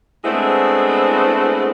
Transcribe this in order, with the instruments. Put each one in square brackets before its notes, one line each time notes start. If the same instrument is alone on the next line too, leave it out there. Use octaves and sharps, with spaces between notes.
[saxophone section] G#3 A3 B3 C4 D4 E4